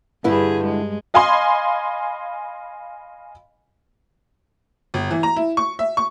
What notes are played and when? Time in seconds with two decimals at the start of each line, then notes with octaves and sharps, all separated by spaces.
0.24 G2 D3 E4 G#4 B4
0.64 G#3
1.14 D#5 F5 G#5 B5 C6
4.94 G1
5.11 E3
5.23 A#5
5.36 E4
5.57 C#6
5.79 E5
5.97 C#6